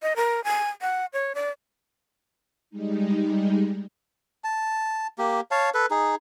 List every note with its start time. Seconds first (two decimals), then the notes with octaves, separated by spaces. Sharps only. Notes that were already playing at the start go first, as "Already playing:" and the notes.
0.02 D#5
0.16 A#4
0.44 G#5
0.82 F#5
1.13 C#5
1.35 D5
2.70 G3 G#3 D#4
4.44 A5
5.18 A#3 G4
5.51 C#5 F5 A5
5.74 A4 B4
5.91 D#4 G#4